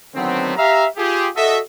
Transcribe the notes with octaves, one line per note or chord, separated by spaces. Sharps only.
D3 D#3 F#3 A3 B3 C4
G4 E5 F5 A#5
F4 G4 G#4
F#4 A4 D#5 E5